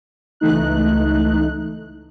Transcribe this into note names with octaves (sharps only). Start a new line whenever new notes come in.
C#2 E3 A3 D#4 F#6